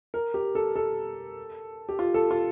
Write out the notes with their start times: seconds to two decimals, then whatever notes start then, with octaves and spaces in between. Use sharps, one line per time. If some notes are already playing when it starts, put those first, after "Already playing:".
0.14 A#4
0.34 G4
0.55 A4
0.76 A4
1.89 G4
1.99 F4
2.14 A4
2.31 F4